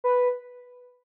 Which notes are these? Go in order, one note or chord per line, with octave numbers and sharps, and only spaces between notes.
B4